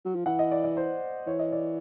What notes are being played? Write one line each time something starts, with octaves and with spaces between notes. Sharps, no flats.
F#3
F3
E3 F#5
D#5
D5
D5
C5
E3 C#5
D#5
D5